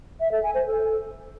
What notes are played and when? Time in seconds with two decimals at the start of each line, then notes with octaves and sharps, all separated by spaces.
0.20 E5
0.32 A4
0.43 G#5
0.55 C5
0.66 A4